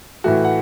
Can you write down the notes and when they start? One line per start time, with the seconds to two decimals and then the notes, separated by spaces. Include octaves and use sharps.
0.24 A2 E3 A3 F#4
0.44 F#5